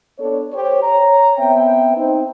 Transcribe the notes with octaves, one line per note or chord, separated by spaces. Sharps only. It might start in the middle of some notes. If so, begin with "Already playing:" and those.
B3 D4 A4 C#5
G4 C5 C#5
C#5 A#5
B3 C4 E5 G5
C4 D#4